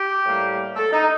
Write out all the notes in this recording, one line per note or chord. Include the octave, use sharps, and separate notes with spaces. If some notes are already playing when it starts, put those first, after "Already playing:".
Already playing: G4
A2 G3 A#3
A4
D#4